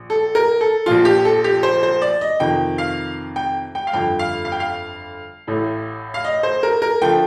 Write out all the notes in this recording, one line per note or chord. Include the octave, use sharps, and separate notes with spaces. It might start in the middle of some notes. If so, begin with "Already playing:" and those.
Already playing: A#1
A4
A#4
A4
A#1 A#2 F3 F4
G4
A4
G4
C5
C5
D5
D#5
F2 C3 D#3 G5
F5
G5
G5
F5
G1 F2 D3 G5
F5
F5
G5
F5
A1 A2 A3
F5
D#5
C5
A#4
A#4
D3 F3 A3 G5